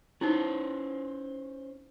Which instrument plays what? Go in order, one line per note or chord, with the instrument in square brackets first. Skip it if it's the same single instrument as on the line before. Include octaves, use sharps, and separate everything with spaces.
[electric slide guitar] C#4 B4 C5 [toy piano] D#4 E4